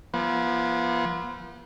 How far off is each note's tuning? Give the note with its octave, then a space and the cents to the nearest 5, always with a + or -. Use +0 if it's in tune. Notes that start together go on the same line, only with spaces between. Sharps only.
F3 -30 B3 -40